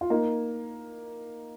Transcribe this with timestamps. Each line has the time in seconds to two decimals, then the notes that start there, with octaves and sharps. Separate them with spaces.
0.01 F4
0.10 A#3 D#4